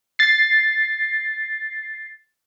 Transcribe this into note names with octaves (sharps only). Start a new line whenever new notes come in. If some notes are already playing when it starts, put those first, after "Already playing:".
A6 C7